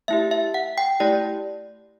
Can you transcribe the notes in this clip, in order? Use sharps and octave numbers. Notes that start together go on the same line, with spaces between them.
A3 E4 G4 E5
E5
F#5
G5
A3 E4 G4 D5